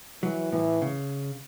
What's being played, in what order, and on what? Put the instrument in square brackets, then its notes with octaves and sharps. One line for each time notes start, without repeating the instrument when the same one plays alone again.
[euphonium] E3 [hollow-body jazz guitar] F#3
[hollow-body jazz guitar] A2 [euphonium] E3
[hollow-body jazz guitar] C#3